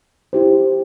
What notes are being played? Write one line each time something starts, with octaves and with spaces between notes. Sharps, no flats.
E4 G4 C5